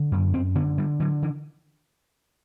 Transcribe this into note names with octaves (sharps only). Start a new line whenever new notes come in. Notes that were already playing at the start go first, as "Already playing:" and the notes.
Already playing: D3
F#2
F#2 C4
D3 B3
D3 G3
D3 F#3
D3 E3